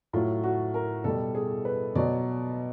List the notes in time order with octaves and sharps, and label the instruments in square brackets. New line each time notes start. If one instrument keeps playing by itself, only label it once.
[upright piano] A2 F#3 F4
F#4
A#4
B2 G3 A4
G#4
B4
B2 F#3 D5